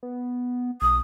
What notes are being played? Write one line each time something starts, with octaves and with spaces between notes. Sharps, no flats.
B3
B1 D#6